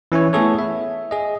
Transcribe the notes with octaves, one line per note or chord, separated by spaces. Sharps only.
E3 C#4 E4 C#5
A3 B3 E4 G#4 A4 C#5
E5
G#4 D#5